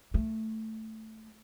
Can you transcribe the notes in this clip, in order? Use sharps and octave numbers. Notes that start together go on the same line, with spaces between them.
A3